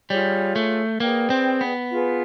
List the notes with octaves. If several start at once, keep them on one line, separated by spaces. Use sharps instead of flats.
G3 F4 G#4 C#5
A3
A#3 G#4 B4 D5 G5
C4
B3
F4 G#4 B4